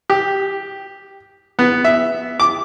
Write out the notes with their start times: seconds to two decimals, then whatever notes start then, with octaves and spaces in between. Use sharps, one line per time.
0.10 G4
1.59 B3
1.84 E5
2.40 D6